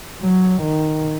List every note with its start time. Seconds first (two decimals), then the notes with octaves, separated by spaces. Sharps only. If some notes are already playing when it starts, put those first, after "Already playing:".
0.21 F#3
0.62 D#3